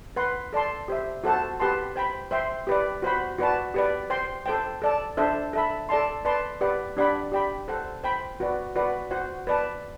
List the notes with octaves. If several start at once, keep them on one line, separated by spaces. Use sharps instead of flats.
B4 F#5 C6
A4 D5 A5 C6
G4 C5 E5
F#4 A4 C5 F#5 A5
G4 B4 F#5 A5 C6
C5 G5 B5
C5 E5 G5 C6
G4 B4 D5
F#4 C5 F#5 B5
F#4 B4 D5 A5
G4 B4 D5
C5 G5 C6
A4 C5 G5
A4 D5 A5
D4 A4 C5 E5
A4 E5 B5
A4 D5 A5 C6
B4 D5 A5 C6
G4 B4 D5 F#5
D4 G4 D5 F#5 B5
G4 D5 G5 B5
A4 C5 F#5
C5 G5 B5
F#4 B4 D5
F#4 B4 D5 F#5
F#4 C5 F#5
B4 D5 A5